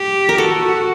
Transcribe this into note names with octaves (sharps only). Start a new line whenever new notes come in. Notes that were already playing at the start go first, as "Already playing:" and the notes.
Already playing: G4
A#4
F#4 A4